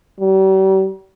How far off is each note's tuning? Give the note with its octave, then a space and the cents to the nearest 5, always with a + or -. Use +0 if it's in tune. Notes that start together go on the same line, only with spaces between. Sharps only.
G3 -40